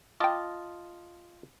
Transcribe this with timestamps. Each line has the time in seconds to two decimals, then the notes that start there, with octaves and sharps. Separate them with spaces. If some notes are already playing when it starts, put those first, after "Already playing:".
0.20 F4 D#5 G5 A5 D6